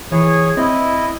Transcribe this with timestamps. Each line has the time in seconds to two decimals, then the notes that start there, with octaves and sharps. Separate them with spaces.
0.12 E3 G#4 C#5
0.57 C4 E4 D#5